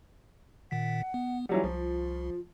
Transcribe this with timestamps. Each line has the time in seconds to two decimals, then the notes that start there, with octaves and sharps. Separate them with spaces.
0.71 A#2 D#3 F#5 B6
1.14 B3
1.49 E3 F#3 G3 F4 F#5
1.64 C2 F3